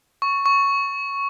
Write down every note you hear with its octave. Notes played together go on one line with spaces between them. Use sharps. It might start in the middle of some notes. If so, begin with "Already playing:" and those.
C#6
C#6